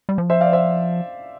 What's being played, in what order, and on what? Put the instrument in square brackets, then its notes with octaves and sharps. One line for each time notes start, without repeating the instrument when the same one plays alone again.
[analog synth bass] G3
F3
[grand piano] C5 E5
D5 F5
C5 E5